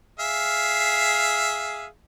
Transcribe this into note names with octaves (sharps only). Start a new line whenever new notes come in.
G#4 E5 F5